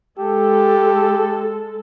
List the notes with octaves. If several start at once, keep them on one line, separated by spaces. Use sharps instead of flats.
G#3 G4 A4